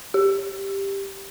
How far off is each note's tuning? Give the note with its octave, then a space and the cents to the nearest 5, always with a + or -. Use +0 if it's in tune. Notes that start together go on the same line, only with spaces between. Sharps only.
G4 +5